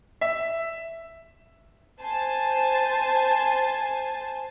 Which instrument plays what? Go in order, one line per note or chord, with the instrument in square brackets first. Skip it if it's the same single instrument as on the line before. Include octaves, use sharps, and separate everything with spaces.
[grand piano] E5
[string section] C5 G#5 A5